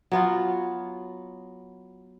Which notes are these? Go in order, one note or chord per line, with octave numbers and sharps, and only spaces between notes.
F#3 B3 F4